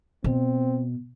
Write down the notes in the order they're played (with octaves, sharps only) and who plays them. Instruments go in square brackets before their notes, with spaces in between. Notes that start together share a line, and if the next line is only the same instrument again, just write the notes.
[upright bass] B2 [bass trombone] C4